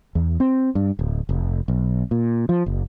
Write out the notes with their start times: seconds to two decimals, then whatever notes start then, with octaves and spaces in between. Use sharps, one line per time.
0.15 E2
0.40 C4
0.75 G2
0.99 D1
1.29 F1
1.68 B1
2.11 A#2
2.49 F3
2.66 F#1